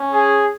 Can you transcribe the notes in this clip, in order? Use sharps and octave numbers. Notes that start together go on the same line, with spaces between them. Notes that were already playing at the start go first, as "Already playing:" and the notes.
Already playing: C#4
G#4